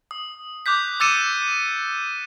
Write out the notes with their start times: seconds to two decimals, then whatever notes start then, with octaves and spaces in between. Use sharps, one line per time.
0.11 D#6
0.66 D6 F#6 G6 B6
1.00 D6 E6 A6 C#7 D#7 E7